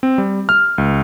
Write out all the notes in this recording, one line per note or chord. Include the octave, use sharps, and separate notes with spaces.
C4
G3
F6
C#2